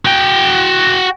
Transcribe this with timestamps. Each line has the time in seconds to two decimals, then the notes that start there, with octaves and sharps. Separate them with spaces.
0.05 F#4 G5